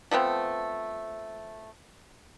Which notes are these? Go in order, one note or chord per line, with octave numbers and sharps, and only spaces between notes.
F3 A3 B3 C4